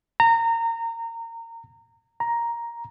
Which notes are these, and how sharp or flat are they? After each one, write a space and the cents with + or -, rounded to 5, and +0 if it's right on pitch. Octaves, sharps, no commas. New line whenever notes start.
A#5 -25
A#5 +5